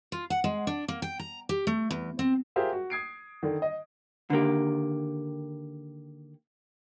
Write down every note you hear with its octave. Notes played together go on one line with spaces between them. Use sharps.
F4
F#5
G#3
D4
A#3
G5
A#5
G4
A3
E2
C4
F4 G4 G#4 A#4 C5 E5
F#4
D#6 G#6 C7 D7
D3 D#3
D#5
D3 D#3 A#3 G4